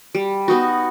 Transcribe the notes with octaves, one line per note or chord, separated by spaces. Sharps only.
G3
B3 D#4 F#4